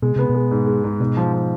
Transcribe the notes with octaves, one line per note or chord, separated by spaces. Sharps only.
B2 G#3
C3 B3
B2
G#3
G#2
G#3
G#2
G#2 B2
F3
F3